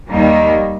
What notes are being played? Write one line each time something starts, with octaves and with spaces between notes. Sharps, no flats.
D#2 D#3 G3 A#3 D#4